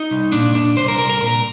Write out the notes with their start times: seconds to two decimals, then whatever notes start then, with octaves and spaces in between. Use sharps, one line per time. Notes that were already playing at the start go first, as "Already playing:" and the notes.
Already playing: D#4
0.11 C2
0.32 A#2 D4
0.55 A#2 D4
0.77 C2 C5
0.88 A#4
0.98 C2 A#4
1.09 A#4
1.21 A#2 A#4